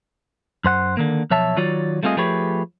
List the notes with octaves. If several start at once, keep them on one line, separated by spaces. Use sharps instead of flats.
F#2 C5 F#5
D3 D#3 A#3
B1 F3 C#5 E5 A5
D#3 F#3 F4 F#4 C#5 D5
G3 A3 C4 F4 G#4 D#5
F3 A3 G4 G#4 B4 C#5